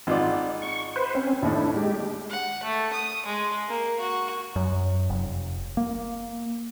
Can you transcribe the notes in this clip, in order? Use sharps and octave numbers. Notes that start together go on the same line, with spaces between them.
G#1 F4 D5
C#6
B4 C5
C4 C#4
D#2 A2 D4 E4
G#3 G4
F#5
A3
D#6
G#3
A#3
F#4
F#2
F1
A#3